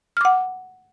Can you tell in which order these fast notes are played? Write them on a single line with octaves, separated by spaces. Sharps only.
F6 D6 F#5